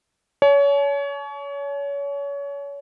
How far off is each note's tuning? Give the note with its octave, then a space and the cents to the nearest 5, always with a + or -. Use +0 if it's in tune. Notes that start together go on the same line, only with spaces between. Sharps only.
C#5 +30 A5 -45